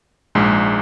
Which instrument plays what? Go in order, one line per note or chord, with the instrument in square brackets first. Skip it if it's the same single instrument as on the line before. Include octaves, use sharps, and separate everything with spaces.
[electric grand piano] A#1 G#2 G#3